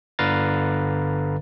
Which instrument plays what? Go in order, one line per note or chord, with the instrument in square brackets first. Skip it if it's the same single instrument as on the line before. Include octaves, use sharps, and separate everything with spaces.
[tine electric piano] G1 D3 B4 F5 A#5 A6